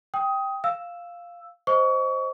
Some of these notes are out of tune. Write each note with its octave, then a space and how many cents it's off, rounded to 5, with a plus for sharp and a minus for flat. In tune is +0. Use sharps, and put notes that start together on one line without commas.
G5 +0 D#6 +15
F5 +0 E6 +0
C5 +0 D#5 +0 C#6 +30